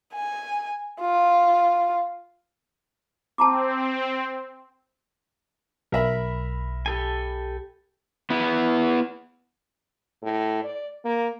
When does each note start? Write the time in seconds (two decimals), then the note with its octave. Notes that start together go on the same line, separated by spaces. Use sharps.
0.14 G#5
1.01 F4
3.38 C4 A5 A#5 D6
5.92 B1 A#4 E5 B5
6.86 G4 A4 G#5
8.30 B3 E4
10.23 A2
10.64 D5
11.05 A#3